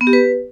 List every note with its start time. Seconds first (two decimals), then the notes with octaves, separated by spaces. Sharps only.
0.01 B3
0.07 G4
0.13 B4